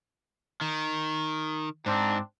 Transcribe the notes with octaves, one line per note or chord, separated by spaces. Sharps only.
D#3
G#2 C4 D4